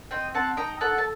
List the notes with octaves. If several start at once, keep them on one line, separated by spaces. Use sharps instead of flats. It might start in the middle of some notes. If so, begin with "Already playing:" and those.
C4 D#5 G5
C4 F#5 A5
D#4 G5 A#5
A4 F#5 A5
A5